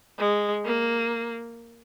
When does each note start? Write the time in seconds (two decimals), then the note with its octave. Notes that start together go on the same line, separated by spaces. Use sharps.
0.19 G#3
0.65 A#3